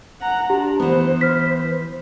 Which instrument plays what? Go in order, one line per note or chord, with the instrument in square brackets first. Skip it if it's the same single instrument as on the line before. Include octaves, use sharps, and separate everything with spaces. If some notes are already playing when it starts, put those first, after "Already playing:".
[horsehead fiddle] F#5 A#5
[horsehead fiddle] D4 [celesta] G4
[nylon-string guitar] E3 B3 [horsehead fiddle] C5
[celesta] F6 B6